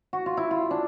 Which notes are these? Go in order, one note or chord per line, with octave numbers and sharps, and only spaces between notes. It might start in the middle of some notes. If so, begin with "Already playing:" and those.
F#4
F4
E4
F4
D4